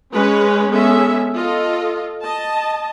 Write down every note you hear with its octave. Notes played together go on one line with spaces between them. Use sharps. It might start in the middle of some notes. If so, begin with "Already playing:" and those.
G#3 C#4 B4 C#5
G#3 B3 C#4 G#4 A4 E5
F4 A4 D#5
D#5 A5